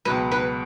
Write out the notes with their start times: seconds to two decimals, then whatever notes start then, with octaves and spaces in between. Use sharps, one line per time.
0.05 C#2 B2 F#3 B4
0.32 B4